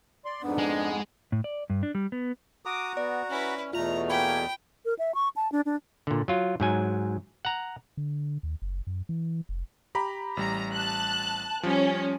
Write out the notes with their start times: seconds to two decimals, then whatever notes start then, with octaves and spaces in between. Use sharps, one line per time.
0.25 D5 C6
0.42 F2 G#2 B3 D4
0.58 G#3
1.32 A2
1.44 D5
1.70 G2
1.83 D4
1.95 G3
2.12 B3
2.65 F#4 A#5 D6 D#6
2.97 B3 D5
3.30 C#4 E4 B4
3.73 E2 B2 A3 F4 A#5 F7
4.10 A#3 G5 G#5 B5 B6
4.85 A#4
4.99 E5
5.14 C#6
5.36 A5
5.52 D4
5.66 D4
6.07 A#2 D3
6.28 F#3 F4
6.60 G#2 F#3 G#5
7.45 F#5 A#5
7.97 D3
8.43 D#2
8.62 F#1
8.87 F#2
9.09 E3
9.49 F1
9.95 G4 A#5 B5
10.37 A1 G3 A#5
10.73 A5 F#6
11.63 F3 G3 C#4